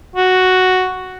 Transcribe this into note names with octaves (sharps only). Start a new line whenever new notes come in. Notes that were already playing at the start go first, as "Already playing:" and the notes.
F#4